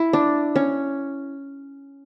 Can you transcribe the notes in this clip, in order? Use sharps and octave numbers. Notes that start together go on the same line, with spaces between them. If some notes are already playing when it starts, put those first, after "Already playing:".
Already playing: E4
D4
C#4